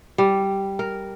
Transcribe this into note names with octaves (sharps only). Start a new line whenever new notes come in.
G3
A#4